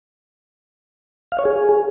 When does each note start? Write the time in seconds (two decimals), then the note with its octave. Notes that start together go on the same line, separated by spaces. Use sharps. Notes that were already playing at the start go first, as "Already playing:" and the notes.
1.32 F5
1.39 C#5
1.45 G#4